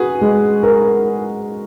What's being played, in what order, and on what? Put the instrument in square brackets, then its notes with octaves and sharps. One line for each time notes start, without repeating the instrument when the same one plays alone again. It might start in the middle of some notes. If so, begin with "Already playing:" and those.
Already playing: [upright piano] F#4 [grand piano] G#4 B4
[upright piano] G#3
A#4